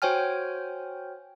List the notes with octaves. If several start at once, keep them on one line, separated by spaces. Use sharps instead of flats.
F#4 C5 C#5 G5 G#5 F6